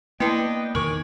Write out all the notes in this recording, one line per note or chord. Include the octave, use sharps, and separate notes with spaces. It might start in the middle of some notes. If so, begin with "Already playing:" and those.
A#3 B3 D4 E4 B4 D#5 G5
E2 B2 D#3 A#4 C#5 G#5 D6